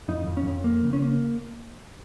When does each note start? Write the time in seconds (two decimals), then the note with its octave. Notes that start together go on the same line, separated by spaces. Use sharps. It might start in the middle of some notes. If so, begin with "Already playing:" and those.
0.08 F2 D#4
0.27 F2
0.37 C#4
0.46 F2
0.64 A#3
0.83 C#3
0.93 C#4
1.02 A#3